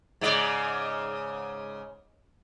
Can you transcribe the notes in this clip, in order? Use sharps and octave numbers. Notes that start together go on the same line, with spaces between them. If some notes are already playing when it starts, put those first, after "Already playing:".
G#2 C#3 D5